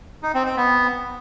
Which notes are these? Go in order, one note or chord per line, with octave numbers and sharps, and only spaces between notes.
D#4
C4
C4
B3